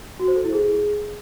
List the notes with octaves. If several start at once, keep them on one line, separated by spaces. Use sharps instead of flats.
F#4
C5
A4
E4
G#4